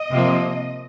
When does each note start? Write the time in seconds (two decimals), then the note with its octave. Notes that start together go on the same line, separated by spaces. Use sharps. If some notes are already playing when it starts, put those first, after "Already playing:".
Already playing: D#5
0.10 C3 F3 A#3